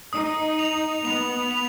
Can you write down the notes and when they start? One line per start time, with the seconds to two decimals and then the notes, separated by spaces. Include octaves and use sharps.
0.13 D#4 D#6
0.59 F7
1.04 B3 F7
1.51 F7